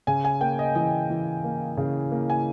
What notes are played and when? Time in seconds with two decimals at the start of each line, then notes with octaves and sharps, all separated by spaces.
0.07 C#3 G#5
0.25 G#5
0.41 A#3 G5
0.59 D#5
0.75 E3 D#5
1.10 E3
1.44 A#3
1.77 C#3
2.12 A#3
2.30 G#5